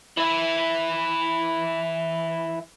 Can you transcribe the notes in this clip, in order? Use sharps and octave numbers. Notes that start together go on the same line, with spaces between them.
E3 E4